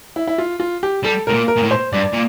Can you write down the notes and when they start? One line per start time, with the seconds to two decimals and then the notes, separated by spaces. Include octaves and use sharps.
0.16 E4
0.28 E4
0.38 F4
0.60 F4
0.83 G4
1.04 G3 A4
1.27 A2 A#4
1.34 A#2
1.48 A#4
1.57 A#2
1.63 A2
1.71 C5
1.92 G2 D5
2.13 A#2